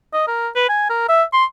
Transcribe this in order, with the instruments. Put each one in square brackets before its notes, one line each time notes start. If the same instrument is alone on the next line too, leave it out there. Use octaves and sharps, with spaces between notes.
[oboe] D#5
A#4
B4
G#5
A#4
E5
C6